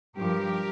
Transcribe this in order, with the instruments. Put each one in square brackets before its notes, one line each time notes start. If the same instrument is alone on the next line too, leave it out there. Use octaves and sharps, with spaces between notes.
[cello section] G2 F3 G4 A#4